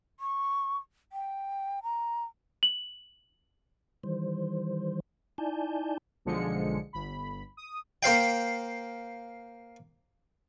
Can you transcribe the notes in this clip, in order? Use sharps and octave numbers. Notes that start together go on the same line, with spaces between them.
C#6
G5
A#5
F#7
D#3 E3 G3 C5
D#4 E4 D5 G#5 A5 G6
B1 D3 F3 G#3 C#7
G1 B5
D#6
A#3 C5 F5 G5